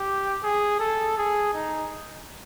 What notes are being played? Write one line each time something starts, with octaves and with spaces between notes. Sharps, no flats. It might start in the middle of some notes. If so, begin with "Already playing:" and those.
Already playing: G4
G#4
A4
G#4
D#4